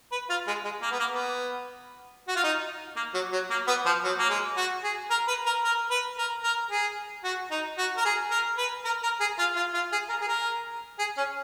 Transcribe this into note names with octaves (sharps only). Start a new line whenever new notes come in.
B4
F4
G#3
G#3
A#3
B3
A#3
B3
F#4
F4
D#4
A#3
F#3
F#3
A#3
B3
F3
F#3
A#3
G#3
F#4
G#4
A#4
B4
A#4
A#4
B4
A#4
A#4
G#4
F#4
D#4
F#4
A#4
G#4
A#4
B4
A#4
A#4
G#4
F4
F4
F4
G#4
A#4
G#4
A#4
G#4
C#4